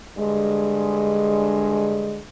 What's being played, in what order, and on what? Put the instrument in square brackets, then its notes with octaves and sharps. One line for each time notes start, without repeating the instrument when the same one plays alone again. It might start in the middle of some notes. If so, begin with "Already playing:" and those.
[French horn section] G2 D3 G#3